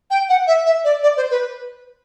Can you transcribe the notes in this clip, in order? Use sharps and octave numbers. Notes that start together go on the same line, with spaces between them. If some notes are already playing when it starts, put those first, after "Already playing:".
G5
F#5
E5
E5
D5
D5
C5
B4